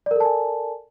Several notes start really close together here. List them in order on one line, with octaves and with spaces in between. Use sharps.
D5 A#4 A4 A5 G#5